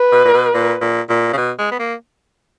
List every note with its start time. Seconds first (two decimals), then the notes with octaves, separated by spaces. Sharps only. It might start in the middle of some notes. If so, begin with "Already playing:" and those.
Already playing: B4
0.12 B2
0.25 A#2
0.33 B2
0.54 A#2
0.82 A#2
1.09 A#2
1.33 C#3
1.37 B2
1.59 G#3
1.72 B3
1.79 A#3